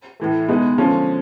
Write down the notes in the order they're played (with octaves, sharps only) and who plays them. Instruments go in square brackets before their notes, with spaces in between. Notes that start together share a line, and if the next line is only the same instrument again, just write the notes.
[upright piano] A2 E3 A3
B2 G#3 B3 D#4
D3 F3 G#3 C#4